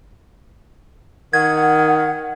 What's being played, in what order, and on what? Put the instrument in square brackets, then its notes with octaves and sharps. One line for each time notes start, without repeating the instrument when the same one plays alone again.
[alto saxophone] D#3 [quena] F#5 [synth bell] G#6